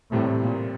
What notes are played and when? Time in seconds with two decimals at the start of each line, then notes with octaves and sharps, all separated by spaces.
0.12 E2 A2 C3 G3 C4
0.41 A#2